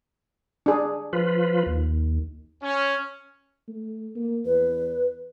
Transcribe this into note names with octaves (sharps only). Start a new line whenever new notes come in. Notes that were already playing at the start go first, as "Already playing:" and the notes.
D4 G#4
F3 F4 B4
D#2
C#4
A3
A#3
E2 B4